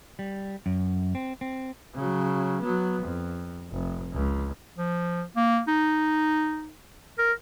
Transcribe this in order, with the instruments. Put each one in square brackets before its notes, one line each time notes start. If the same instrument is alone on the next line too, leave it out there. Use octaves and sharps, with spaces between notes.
[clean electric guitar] G3
F#2
C4
C4
[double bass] C#3 F#3
F#3 B3
F2
F1
C#2
[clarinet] F3
A#3
D#4
A#4